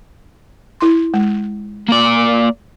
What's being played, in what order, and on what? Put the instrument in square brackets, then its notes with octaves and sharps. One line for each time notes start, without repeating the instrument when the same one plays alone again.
[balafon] E4 C6
G#3
[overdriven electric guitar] A#3 D5